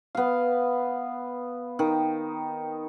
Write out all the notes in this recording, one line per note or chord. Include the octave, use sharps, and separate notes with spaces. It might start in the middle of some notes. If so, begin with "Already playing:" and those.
B3 F5
D#3